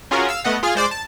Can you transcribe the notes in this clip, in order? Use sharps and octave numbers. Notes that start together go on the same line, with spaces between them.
C#4 F4 F#4 G#4 A#4
F5 E6
A3 B3 D#5 F#5
F4 G#4 F6
G#3 C5 D5 D6
A5